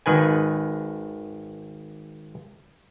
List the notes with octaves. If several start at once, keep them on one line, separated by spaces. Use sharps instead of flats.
G#1 D#3 B4 G#5